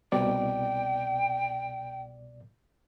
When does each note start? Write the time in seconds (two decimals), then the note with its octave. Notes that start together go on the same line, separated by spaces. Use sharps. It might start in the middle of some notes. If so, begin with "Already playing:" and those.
0.12 C2 B2 D5 G5